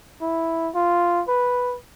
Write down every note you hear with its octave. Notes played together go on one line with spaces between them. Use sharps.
E4
F4
B4